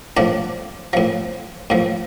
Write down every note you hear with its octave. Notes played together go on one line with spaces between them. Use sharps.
A2 F3 D4 D5
A2 F3
A2 F3